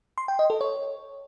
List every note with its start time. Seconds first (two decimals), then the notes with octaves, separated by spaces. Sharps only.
0.18 C6
0.28 G5
0.39 D#5
0.50 A4
0.61 C#5